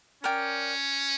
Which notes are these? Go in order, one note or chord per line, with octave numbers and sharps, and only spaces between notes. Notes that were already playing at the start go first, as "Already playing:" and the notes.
C#4 A#4 D5 G5